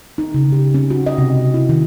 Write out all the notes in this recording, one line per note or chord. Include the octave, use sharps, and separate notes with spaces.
D#4
C#3
G4
C#4
F#4
D#5
C3
E4
D#3